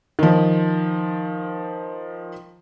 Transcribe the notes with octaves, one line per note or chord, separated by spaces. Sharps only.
D#3 F3